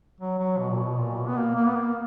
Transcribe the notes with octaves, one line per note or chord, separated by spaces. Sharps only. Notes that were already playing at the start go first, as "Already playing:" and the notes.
F#3
F#3
B2
A#2
B2
A#2
B2
B3
A#3
A#3
B3
A#3